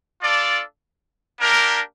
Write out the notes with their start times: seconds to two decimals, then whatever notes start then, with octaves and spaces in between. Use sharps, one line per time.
0.21 D4 F4 A4 D5
1.39 A#3 D4 G4 A#4